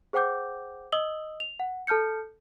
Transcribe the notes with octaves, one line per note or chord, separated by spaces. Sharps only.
G#4 C5 F#5 G5 D6 G6
D#5 D#6 E6 F#7 G7
F7
F#5
A4 A5 F6 G6 C#7